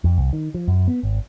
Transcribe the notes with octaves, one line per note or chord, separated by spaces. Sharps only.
F2
C2
D#3
F3
F#2
B3
G#1